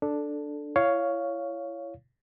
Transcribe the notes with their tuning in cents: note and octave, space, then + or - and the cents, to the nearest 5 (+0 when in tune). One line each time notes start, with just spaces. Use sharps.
D4 +5 A4 +0
E4 +30 C#5 +10 F5 +0